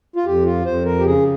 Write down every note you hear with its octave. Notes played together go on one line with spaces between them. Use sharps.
F4
F2 G4
F4
F2 C5
A#4
G4
C#3 G#4